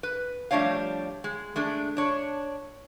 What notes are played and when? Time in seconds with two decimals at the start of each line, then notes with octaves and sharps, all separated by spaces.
0.03 B4
0.51 F3 G3 A3 D4 C#5 F5
1.24 G#3
1.56 G#3 A3 D4
1.97 D4 C#5